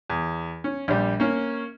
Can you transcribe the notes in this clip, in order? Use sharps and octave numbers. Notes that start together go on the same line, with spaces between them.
E2
C#4
A#1 G3
A#3 C#4